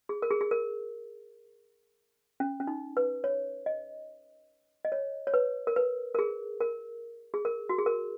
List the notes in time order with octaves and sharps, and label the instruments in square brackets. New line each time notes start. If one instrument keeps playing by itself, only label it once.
[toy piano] G#4
A#4
G#4
G#4
A#4
C#4
C#4
D#4
B4
C#5
D#5
D#5
C#5
C#5
B4
A#4
B4
A#4
G#4
A#4
G#4
A#4
F#4
G#4
A#4